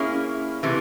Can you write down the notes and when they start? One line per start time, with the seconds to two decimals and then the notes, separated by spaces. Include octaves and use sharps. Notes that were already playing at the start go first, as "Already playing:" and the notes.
Already playing: A#3 C#4 E4 G#4
0.63 C3 E3 A3